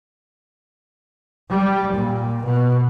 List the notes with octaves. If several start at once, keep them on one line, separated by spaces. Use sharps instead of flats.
G3
A#2
B2